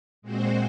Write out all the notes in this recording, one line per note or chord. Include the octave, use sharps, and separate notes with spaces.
A#2 G#3 C4 F#4 C5